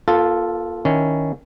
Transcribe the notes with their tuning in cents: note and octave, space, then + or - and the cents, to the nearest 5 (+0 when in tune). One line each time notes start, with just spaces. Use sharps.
A#3 +40 F4 +0 A4 +0
D#3 +5 C#4 +0 E4 +0